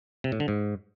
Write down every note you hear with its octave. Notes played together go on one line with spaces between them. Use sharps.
C3
A2
D3
G#2